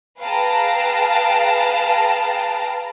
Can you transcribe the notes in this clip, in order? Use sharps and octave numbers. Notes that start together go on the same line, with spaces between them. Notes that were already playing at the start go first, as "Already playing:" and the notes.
G#4 B4 F5 G5 A5 A#5